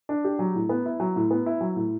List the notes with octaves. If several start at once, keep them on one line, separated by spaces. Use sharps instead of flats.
D4
G4
F#3
A2
B3
E4
F#3
A2
B3
E4
F#3
A2